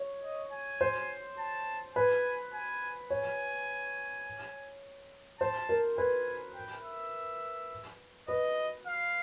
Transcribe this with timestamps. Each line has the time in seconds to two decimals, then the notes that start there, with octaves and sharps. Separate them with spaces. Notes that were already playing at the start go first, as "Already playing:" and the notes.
Already playing: C#5
0.22 D#5
0.52 G#5
0.81 C5
1.38 A5
1.95 B4 G#5
2.54 G#5
3.10 C#5 G#5
5.40 C5 A5
5.69 A#4
5.98 B4 G#5
6.55 G5
6.84 E5
8.28 B4 D#5
8.86 F5